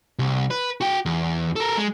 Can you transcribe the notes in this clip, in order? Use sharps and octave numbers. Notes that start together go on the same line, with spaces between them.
C2
B4
F#4 G5
E2
A4 A#4
G#3